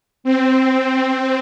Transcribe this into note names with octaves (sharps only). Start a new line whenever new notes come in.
C4